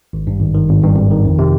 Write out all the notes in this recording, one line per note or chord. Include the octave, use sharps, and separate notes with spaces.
G#1
G2
G#1
D#3
G#1
G2
G#1
D#3
F2
C3